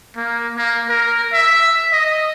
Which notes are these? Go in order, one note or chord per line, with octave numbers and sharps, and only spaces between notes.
A#3
A#3
A#4
E5
D#5